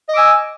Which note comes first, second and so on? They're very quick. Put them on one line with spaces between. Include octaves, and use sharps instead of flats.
D#5 D6 E6 G#5